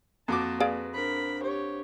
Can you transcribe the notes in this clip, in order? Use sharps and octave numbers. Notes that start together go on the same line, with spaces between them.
F2 A#3 F#4 A5 D6
G#4 B4 D5 F5
D4 A#4 C5 B5
G4 C#5